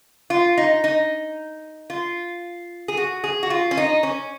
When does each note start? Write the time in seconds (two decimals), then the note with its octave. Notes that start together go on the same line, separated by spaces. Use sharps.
0.30 F4
0.58 D#4
0.84 D#4
1.90 F4
2.88 G#4
2.97 F#4
3.24 G#4
3.43 F#4
3.50 F4
3.71 C#4
3.77 D#4
4.03 C#4